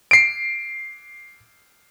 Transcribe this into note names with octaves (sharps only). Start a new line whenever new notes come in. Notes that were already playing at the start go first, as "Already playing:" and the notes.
C7 D7